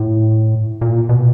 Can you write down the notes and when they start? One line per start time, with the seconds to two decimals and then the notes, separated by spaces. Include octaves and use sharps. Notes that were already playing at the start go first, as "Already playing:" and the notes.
Already playing: A2
0.81 A#2
1.09 B2